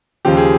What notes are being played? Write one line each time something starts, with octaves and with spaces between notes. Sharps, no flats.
D#2 C#3 F3 G4
G#4